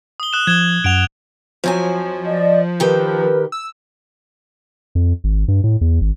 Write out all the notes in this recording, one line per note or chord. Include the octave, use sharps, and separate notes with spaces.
D#6 G7
D#6 F#6 E7
F3 G#6 E7 G7
F#2 F#5 D7 F7 G7
F2 F3 F#3 G#5
D5 D#5
D#3 G4 A#4 B4
E6
F2
G#1
G2
A2
E2
G#1